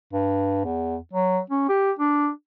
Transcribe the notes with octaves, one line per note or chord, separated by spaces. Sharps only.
G2
E2
F#3
C#4
G4
D4